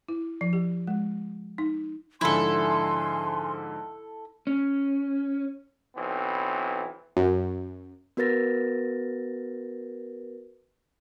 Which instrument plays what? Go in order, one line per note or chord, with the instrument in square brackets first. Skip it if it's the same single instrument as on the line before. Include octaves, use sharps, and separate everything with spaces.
[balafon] E4
F3
G4
G#3
D#4
[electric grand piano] G#2 D3 F3 [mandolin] E4 A4 [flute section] G#5 C6
[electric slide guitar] C#4
[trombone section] B1 E3 C4
[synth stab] F#2
[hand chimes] B3 F#4 A#4 B4 A6 A#6